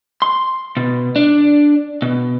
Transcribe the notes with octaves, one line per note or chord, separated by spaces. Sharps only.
C6
B2
D4
B2